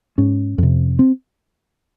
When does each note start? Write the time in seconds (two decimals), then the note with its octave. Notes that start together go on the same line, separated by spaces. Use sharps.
0.18 G#2 C#4
0.58 F2 C3
0.99 C4